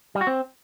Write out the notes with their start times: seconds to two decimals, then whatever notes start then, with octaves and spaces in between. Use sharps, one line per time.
0.15 G3
0.21 F#4
0.27 C4